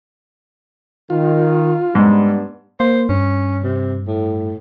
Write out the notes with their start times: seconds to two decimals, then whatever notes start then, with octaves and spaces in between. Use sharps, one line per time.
1.10 D#3 F4
1.95 G#2 G3 B3 D4
2.80 A#3 C5
3.09 G2 C#4
3.63 C3
4.07 A2